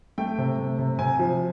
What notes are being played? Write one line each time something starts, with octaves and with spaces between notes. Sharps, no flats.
A3 G5
C3
A3
C3
C3 G#5
F3